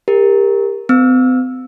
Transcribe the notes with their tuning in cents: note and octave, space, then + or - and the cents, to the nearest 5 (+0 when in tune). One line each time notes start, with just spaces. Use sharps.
G4 +30 A#4 +0
C4 -45 E6 +0